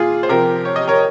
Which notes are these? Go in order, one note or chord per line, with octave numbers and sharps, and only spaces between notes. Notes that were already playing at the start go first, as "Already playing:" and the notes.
Already playing: A#2 F4 G#4
C5
C3 F3 G4 A#4
C#5
D#5
A#4 C#5